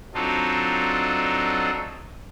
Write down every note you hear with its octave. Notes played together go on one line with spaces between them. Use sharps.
F#3 C4 D4 D#4 F4 A4